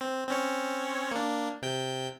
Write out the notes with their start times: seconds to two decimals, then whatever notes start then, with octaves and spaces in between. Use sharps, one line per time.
0.01 C4
0.28 C4 C#4 C#5
1.12 A#3 D4
1.62 C3 G5 G6